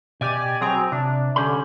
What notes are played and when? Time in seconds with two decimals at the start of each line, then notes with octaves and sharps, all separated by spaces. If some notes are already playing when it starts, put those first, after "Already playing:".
0.21 B2 G4 D5 G#5
0.61 F#3 C4 G#4 G5 G#5 A#5
0.92 C3 D4
1.36 C2 D3 C#4 G4 B5